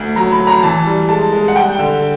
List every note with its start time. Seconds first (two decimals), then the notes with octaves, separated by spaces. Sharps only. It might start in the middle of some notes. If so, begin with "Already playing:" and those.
Already playing: D2
0.16 F#3 A#5
0.32 B5
0.39 F#3
0.47 A#5
0.63 E3 A5
0.86 G3
1.09 G#3 A5
1.33 G#3
1.48 F#5
1.56 G3 G5
1.79 D3